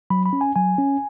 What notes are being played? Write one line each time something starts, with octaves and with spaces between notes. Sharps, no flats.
F#3 B5
B5
C#4
G#5
F#3 G#5
C#4